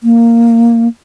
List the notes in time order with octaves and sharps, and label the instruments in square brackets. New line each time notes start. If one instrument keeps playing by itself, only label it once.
[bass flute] A#3